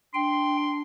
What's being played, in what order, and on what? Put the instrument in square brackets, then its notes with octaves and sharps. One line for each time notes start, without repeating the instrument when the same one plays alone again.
[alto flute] D4 [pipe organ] G5 [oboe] C6